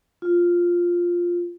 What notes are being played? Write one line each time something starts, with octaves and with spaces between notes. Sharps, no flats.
F4